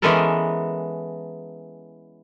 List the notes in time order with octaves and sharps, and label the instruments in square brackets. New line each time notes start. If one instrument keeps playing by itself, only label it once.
[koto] E3 G#3 B3 C#4 A4 A#4